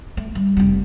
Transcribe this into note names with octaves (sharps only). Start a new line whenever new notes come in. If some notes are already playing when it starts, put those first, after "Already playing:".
A3
G3
F1 G3